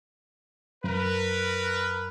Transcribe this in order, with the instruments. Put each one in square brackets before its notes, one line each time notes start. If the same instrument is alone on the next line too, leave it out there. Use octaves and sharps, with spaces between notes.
[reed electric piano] F#2 [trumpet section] A#4 B4